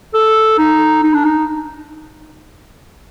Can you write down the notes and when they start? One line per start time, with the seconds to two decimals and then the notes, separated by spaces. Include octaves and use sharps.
0.14 A4
0.59 D#4
1.03 D#4
1.14 D4
1.25 D#4